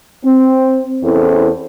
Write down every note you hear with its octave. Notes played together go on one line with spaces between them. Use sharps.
C4
E2 C4 C#4 E4 A4 C5